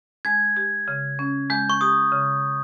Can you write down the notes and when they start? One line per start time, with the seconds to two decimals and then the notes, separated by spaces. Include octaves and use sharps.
0.25 G#3 G#6
0.57 G4
0.88 C#3
1.19 C#4
1.50 G#3 G6
1.70 C#6
1.81 G4 D#6
2.11 C#3